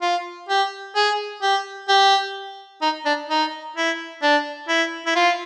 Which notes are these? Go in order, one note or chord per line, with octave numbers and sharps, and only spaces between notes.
F4
G4
G#4
G4
G4
D#4
D4
D#4
E4
D4
E4
E4
F4